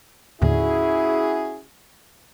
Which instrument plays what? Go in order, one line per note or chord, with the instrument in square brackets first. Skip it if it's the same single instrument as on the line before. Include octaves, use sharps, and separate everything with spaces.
[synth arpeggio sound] D#2 A2 D3 [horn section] C#4 F#4 G#4 [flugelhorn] E4